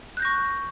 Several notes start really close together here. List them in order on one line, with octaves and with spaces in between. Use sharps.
F#6 G6 A#6 C#6